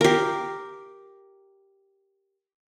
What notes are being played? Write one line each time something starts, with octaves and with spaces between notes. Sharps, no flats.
G4 A#4